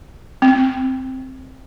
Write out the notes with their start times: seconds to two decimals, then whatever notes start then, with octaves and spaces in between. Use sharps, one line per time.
0.42 C4